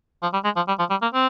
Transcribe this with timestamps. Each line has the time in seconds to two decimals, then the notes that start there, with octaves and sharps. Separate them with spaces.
0.22 F3
0.33 G3
0.44 G#3
0.56 F3
0.68 G3
0.79 F3
0.90 G3
1.02 A#3
1.14 C4